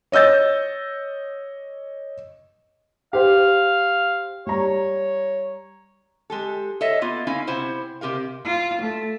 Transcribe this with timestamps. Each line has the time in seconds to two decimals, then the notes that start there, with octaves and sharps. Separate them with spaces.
0.12 C#5 D#5 E6 G6 A6
3.13 G4 C5 F5
4.47 G3 C#5 A#5
6.30 G#3 G4 A4
6.81 A4 C#5 D#5 E5
7.01 A#3 B3 F4
7.27 C#4 D#4 E4 F5
7.47 C3 E4 C5 F#5
8.01 C3 G4 A#4 F5
8.45 F4
8.82 A3